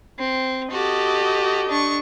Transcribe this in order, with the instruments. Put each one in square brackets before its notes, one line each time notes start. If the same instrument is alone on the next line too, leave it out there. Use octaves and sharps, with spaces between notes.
[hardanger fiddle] C4
[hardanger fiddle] F#4 A4 [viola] G4 D#5
[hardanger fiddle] D4 C#6